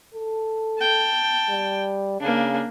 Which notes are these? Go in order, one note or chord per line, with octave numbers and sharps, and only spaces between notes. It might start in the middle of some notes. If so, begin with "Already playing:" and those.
A4
G5 A5
G3
C#3 A#3 D4